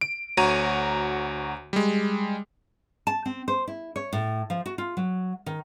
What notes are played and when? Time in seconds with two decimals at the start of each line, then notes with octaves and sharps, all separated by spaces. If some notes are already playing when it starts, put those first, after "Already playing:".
0.01 D7
0.37 D2 F#4 C#5 A#5 D#7
1.73 G3 G#3
3.07 A5
3.26 C4
3.48 C5
3.68 E4
3.96 C#5
4.13 A2
4.50 F3
4.66 F#4
4.78 F4
4.97 F#3
5.46 D#3